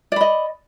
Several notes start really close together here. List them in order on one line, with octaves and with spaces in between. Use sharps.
D5 B5 D#5